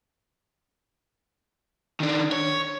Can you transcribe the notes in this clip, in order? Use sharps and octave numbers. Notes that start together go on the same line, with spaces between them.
D#3 D4
C#5